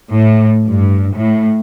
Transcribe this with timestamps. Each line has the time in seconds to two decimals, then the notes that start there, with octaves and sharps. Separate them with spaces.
0.11 A2
0.67 G2
1.14 A2